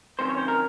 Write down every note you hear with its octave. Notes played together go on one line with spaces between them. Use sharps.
C3 D#3 F#3 C#4 C5
C#5
C5
A#4